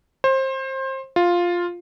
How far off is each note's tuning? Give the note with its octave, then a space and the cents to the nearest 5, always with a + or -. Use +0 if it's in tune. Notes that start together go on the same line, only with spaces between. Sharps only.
C5 +25
F4 +5